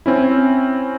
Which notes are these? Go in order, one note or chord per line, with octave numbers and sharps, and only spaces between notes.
C4 C#4 E4